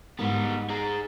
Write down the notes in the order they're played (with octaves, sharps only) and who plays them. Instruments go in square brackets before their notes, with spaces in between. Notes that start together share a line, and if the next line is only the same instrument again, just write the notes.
[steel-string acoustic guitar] G#2 D#4 A#4 [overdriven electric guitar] G3 B3
[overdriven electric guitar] G#4 A#5